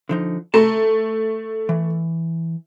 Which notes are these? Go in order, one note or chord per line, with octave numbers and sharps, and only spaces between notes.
D3 F3 D#4
A3 A5 A#5 C6
E3